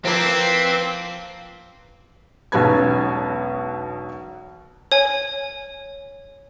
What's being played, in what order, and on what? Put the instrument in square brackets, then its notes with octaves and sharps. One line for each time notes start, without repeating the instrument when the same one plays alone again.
[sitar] F3 A#3 F4 [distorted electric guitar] C4 [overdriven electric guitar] B4 E5
[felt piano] E1 B1 B2 C#4 B4 G#6
[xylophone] C#5 G#5